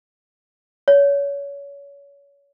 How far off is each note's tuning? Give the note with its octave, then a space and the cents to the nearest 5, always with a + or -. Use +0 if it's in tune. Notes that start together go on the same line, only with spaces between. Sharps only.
C#5 +30